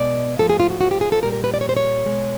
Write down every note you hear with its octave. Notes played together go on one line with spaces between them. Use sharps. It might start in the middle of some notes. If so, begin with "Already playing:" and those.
Already playing: B2 G#3 D5
G#2 F3 A3 A4
G#4
F4
F#4
F#4
G4
G#4
A4
A#2 G3 A#4
A#4
B4
D5
C#5
C5
C#5
B2 G#3